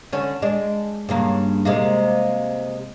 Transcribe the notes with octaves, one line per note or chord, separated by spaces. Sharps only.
D3 C#4
G#3 D4
G2 C#3 A#3
C3 G#3 A#3